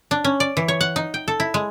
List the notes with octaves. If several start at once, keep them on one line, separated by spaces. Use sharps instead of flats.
D4
C#4
D5
E3
C#5
F#5
D#4
G5
A4
E4
G#3